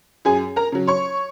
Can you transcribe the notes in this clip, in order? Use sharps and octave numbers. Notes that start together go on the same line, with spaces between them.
F#2 G#4 G#5
A#4 A#5
C#3 F#3
C#5 C#6